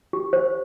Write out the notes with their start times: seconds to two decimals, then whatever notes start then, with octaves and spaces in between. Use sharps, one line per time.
0.13 G4
0.33 C5